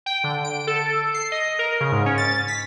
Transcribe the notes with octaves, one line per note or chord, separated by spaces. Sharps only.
G5
D3
D7
A4
C7
D#5
A#4
C#3
G#2
C#4
A6
B6